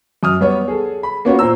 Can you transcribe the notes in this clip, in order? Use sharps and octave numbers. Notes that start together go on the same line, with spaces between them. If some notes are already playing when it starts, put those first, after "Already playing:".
F#2 D#6 F6
G3 B3 C#5
G#4 A4
B5
A#3 B3 C#4 F4 F#4
A#2 C5 A#5 E6